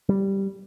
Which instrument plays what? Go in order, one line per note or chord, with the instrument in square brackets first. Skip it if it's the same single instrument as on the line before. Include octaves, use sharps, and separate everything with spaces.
[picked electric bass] G3